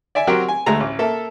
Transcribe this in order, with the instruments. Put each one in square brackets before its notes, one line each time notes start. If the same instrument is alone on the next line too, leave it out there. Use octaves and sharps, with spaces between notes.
[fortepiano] D5 E5 G#5
F#3 C4 F#4 G4 A#4
G#5
D2 G#3 A3 A#5
A1
A#3 A4 E5